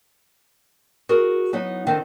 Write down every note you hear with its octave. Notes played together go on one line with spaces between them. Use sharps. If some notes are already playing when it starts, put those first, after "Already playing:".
F#4 G#4 A#4
F#3 B3 D#4
D3 D#3 C4